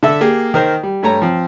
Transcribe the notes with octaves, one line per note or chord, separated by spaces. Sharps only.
D3 A4 E5 A5 E6
A#3 G4 G#4
D#3 A#4 C5
G3
G2 A3 C#5 A#5
F3 C4